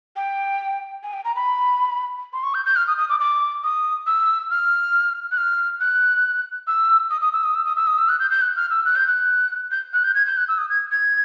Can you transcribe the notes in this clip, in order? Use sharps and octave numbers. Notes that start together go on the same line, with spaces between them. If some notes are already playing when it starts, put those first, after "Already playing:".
G5
G#5
G5
A#5
B5
C6
C#6
G6
G6
F6
D#6
D#6
D6
D6
D#6
E6
F6
F#6
F6
F#6
E6
D#6
D#6
E6
D#6
E6
D#6
E6
D#6
E6
F#6
G6
G6
F#6
F6
E6
F#6
G6
F#6
G6
F#6
G6
G#6
G6
F#6
E6
D#6
G#6
G#6